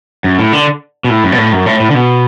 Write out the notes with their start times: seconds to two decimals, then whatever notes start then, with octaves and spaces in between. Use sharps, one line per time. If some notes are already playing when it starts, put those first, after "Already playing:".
0.24 F#2
0.39 A2
0.53 D3
1.04 B2
1.10 A2
1.24 F#2
1.32 B2
1.38 A2
1.52 F#2
1.66 A2
1.80 A2
1.90 D3
1.95 B2